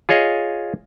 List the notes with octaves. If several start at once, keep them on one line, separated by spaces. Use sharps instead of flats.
F4 G#4 C#5 D#5